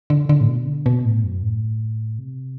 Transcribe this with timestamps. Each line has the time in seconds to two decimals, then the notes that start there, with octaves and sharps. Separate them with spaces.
0.10 D3
0.29 D3
0.41 A2
0.48 B2
0.67 D3
0.86 B2
1.05 A2
1.24 F#2
1.43 A2
2.19 C3